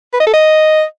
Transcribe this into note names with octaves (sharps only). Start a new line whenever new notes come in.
B4
D#5
A4
D#5